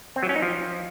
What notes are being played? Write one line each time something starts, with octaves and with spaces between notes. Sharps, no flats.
C4
F#3
C#4
D#4
F3